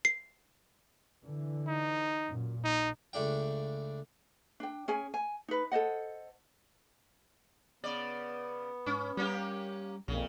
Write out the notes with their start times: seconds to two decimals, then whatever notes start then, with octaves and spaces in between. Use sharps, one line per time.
0.05 C7
1.23 D3 E3
1.68 D#4
2.27 F#2 A#2
2.64 A#1 D#4
3.13 C#2 A3 D4 G5
4.60 D4 G5
4.88 C#4 G#4 G#5
5.14 G#5
5.48 D#4 B4
5.72 A4 C5 D#5 F#5
7.84 C#3 B3 D5
8.86 G#2 C#4
9.17 G3 A#3 C#4 G4
10.08 B1 F2 A#2 C#3